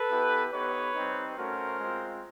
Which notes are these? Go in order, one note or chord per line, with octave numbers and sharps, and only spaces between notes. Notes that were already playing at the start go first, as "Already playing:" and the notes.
Already playing: A4 B4
B3 E4 G4
B3 D#4 G4 B4 C#5
G3 C4 D#4
A3 C#4 F#4 A#4 C5
G#3 C4 F4